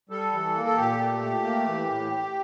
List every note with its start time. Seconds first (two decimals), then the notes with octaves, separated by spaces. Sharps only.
0.09 G3 A4
0.32 E3
0.55 A#3
0.66 A4
0.77 A#2 G4
0.99 A3
1.22 A3
1.44 A#3
1.66 E3
1.88 A2